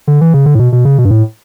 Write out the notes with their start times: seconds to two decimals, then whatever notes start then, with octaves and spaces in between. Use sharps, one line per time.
0.07 D3
0.21 E3
0.34 C#3
0.46 D3
0.55 A2
0.59 B2
0.72 B2
0.85 C#3
0.98 B2
1.05 G2
1.11 A2